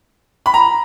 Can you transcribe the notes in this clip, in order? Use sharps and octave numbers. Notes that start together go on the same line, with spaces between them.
B5
A#5